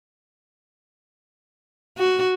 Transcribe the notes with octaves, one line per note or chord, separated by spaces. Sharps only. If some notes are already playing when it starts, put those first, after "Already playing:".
F#4